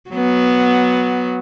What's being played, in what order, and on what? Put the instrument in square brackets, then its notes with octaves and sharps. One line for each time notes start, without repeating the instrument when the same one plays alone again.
[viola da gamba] F#3 B3